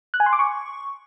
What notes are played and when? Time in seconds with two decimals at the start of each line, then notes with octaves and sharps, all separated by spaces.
0.14 F#6
0.20 G#5
0.26 C6
0.33 D6
0.39 C#6